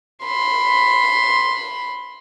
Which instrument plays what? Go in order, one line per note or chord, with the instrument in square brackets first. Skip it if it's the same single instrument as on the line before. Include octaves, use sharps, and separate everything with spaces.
[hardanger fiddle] B5 C6